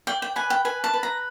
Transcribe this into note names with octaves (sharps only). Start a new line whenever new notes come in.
D5 G5
G5
B4 G#5
G5
B4 G#5
A5
B4
A#5